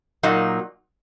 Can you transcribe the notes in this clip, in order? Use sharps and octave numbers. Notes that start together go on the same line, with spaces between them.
A#2 F#3 A#3 D#4